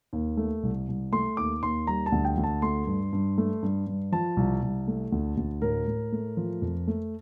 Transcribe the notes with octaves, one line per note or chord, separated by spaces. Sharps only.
D#2
A3
C2
C2
A3 C6
D#2 D6
D#2 C6
G3 A#5
A5
D2
G5
D2
A5
A3 C6
G2
G2
A3
G2
G2
F3 A5
C2
C2
A3
D2
D2
A2 A#4
A2
A3
F3
F2
A3